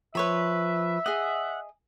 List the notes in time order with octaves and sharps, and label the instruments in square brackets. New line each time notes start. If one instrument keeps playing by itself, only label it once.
[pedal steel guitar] F3 [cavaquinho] B4 C#5 B5 [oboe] E5
[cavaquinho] G#4 D#5 [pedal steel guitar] F#5